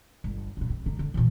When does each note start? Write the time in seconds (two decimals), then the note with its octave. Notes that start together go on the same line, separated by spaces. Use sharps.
0.24 G1
0.57 F#2 A#2
0.70 C4
0.86 D3 D#4
0.99 D3
1.14 A#2 E3